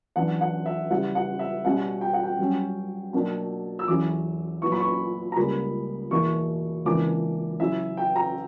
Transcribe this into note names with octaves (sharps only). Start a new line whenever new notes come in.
F#2 E3 B3 D4 F#5
F#5
E5
C#3 G3 B3 E4 F#5
F#5
E5
B2 G3 C#4 F#5
G5
F#5
G5
G2 F#3 C#4
B2 F#3 A#3 D4
E6
E2 D3 F#3 C#4 E4 D6
A#2 F#3 B3 E4 C#6
B5
C#6
A#5
C#2 C#3 G3 A#3 B5
E2 B2 A#3 E4 C#6
C#2 C#3 E3 A#3 D4 D6
C#3 F#3 C#4 E4 E5
G5
A#5